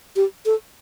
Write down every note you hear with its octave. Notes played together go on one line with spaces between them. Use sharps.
G4
A4